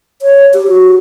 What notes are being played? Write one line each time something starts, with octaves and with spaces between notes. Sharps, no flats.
C#5
G4
F#4